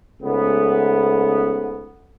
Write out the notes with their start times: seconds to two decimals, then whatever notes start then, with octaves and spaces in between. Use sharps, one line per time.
0.22 C#2 G#2 A3 B3